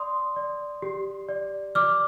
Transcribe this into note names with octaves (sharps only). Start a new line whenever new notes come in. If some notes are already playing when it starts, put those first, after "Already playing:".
Already playing: D5 C6 D#6
D5
G4
D5
D5 D6 F6